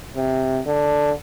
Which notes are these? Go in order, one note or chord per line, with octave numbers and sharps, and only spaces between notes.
C3
D3